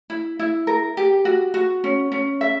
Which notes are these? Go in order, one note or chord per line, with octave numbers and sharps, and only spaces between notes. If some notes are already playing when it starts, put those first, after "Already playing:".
E4
E4
A#4
G4
F#4
F#4
C#4
C#4
E5